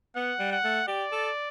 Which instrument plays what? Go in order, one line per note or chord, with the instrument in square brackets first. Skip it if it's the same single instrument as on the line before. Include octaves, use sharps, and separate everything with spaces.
[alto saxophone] B3 [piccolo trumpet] F#5
[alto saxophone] G3
[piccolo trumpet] F#5
[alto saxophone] A3
[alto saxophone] G4 [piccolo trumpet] D5
[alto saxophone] A4